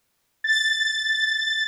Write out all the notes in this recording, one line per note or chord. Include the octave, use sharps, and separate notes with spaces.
A6